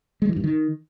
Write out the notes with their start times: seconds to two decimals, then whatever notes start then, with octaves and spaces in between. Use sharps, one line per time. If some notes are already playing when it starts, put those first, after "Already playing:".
0.22 G#3
0.29 E3
0.36 G2
0.44 D#3